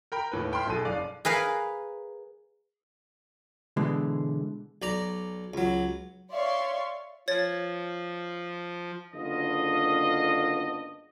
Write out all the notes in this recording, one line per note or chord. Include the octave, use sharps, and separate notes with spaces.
A#4 G5 B5
D#2 A2 B4
E5 G5 B5 C6 F6
B1 B2 D#4 G#4 A4 D#7
F#1 D5 F5
G#4 A#4 B4 F5
B2 D3 E3 G#3
B1 D5 A#5
C#2 F#3
C#5 D5 E5 F5 C6 C#6
F3 C#5 A6
F#1 D3 B3 D4 F4 D#5